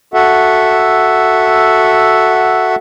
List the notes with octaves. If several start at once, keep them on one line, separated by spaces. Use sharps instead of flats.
F#4 A4 E5 F#5